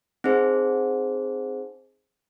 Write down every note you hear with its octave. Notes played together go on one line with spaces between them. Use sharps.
C4 D#4 G#4 C5